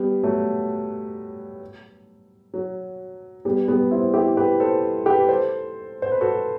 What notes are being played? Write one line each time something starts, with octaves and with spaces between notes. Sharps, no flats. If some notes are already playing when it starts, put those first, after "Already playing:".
Already playing: G3 B3
F#3 A3
F#3
G3 B3
G3 B3
C4 E4
E4 G4
G4 B4
A4 C5
G4 B4
A4 C5
C5
B4
F#4 A4